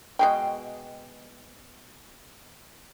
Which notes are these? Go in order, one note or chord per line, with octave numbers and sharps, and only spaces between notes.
B2 G#3 G5